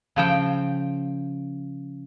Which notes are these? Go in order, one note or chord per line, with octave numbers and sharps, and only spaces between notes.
C#3 F3 G5